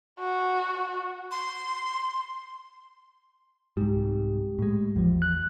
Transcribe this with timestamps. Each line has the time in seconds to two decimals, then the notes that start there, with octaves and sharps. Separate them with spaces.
0.19 F#4
1.31 C6
3.77 C2 G#2 G4
4.59 A2 G#3
4.96 G#1 E2 F3
5.22 F#6